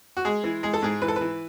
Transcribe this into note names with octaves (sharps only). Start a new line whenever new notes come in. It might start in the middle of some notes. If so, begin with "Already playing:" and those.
F#4
G#3 G#4
E3
G#3 G#4
A4
G#2 G#4
E3 B4
A4
E3 B4